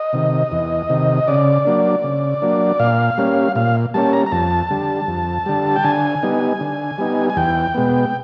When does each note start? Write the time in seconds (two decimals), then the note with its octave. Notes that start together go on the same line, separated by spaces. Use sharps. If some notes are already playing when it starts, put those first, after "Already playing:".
Already playing: D#5
0.13 C3 D#3
0.52 E2
0.90 C3 D#3
1.27 C#3 D5
1.65 F#3 A#3 D4
2.04 C#3
2.42 F#3 A#3 D4
2.79 A#2 F5
3.18 G3 A#3 C#4
3.55 A#2 F5
3.94 G3 A#3 C#4 A5
4.13 A#5
4.26 A#5
4.32 F2 A5
4.71 D3 G3
5.08 F2
5.46 D3 G3
5.76 G5
5.84 D3 G#5
6.23 G3 B3 D#4
6.60 D3
6.98 G3 B3 D#4
7.30 G#5
7.37 E2 G5
7.74 B2 G#3 B3